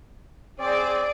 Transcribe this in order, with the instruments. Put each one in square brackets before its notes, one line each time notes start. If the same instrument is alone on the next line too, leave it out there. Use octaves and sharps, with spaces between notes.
[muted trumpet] C4 [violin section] G#4 D5